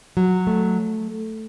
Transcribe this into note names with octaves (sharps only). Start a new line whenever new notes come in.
F#3
A3